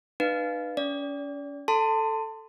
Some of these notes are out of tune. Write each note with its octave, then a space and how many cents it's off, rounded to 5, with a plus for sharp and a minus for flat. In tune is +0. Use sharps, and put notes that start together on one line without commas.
D#4 -40 B4 +0 F5 +0
C#4 +30 D5 -30
A4 +0 A5 +25 C6 -15